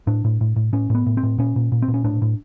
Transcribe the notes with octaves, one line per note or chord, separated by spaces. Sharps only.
A2 D4
A2
A2
A2
A2 C#4
A2 B3
A2
C4
A2
A#2 C#4
A#2
A#2
C4
A#2
C#4
A2 D4
A2